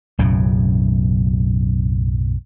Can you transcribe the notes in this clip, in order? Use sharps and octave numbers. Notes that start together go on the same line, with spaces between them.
B1 F#2 A2 C#3